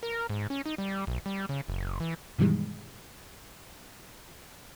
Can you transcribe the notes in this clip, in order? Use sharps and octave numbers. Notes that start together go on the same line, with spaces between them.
A#4
G#2
C#4
D#4
G3
B1
G3
C#3
F#1
E3
G2 B2 D#3 E3 G3 G#3